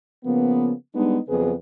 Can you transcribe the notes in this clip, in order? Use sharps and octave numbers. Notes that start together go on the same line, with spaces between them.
C#3 F3 A#3 B3
G3 G#3 B3 D4 D#4
F2 C#3 F#3 B3 G#4 B4